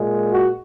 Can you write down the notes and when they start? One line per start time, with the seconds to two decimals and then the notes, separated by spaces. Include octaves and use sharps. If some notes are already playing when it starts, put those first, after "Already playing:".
Already playing: A#2 G#3
0.32 F#4